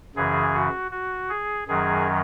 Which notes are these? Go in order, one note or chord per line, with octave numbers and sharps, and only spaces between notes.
F#2 C#3 E3 G#4
F#4
F#4
G#4
F#2 D#3 F#3 G#4